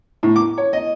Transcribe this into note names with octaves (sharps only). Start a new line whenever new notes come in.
A2
D6
C#5
D#5